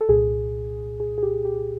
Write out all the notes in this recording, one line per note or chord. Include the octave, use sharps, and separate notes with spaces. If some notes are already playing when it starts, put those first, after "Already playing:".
A4
C2 A#2 G#4
G#4
G#4
G4
G4